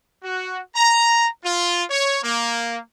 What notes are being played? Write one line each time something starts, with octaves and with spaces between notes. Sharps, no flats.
F#4
A#5
F4
C#5
A#3